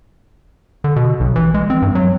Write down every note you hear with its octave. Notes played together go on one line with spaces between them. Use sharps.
D3
B2
B1
E3
G#3
C4
G2
F#3